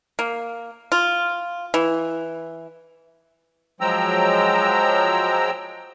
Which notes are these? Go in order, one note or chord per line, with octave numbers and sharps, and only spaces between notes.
A#3
F4
E3
F3 F#3 G#3 G5 A#5 E6